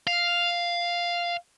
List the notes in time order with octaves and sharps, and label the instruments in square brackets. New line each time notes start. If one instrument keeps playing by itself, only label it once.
[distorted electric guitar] F5